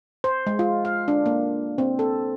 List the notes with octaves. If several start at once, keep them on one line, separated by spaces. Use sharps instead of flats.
C5
G#3
F4
F5
D4
A#3
C4
A4